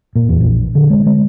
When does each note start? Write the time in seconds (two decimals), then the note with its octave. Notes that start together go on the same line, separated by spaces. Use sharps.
0.15 A#2
0.29 E2
0.41 A#1
0.75 D3
0.90 G#3
1.06 G#3